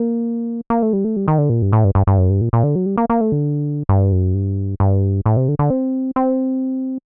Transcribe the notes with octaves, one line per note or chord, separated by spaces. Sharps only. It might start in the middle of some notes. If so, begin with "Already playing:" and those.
Already playing: A#3
A#3
A3
G3
A3
G3
D#3
D3
A#2
G2
A2
G2
G2
G2
F#2
G2
A#2
A#2
D3
F#3
G3
A#3
A#3
A3
D3
G2
F#2
G2
G2
A2
C3
D3
D3
C4
C4